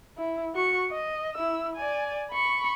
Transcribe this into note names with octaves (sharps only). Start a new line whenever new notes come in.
E4
F#4 C#6
D#5
E4 E6
D5 G#5
B5 C#6